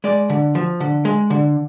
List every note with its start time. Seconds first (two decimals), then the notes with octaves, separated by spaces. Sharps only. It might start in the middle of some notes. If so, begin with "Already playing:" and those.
0.04 G#3 D5
0.30 D3
0.55 F3
0.80 D3
1.05 G#3
1.30 D3